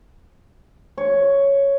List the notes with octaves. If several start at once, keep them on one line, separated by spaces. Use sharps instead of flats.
C#5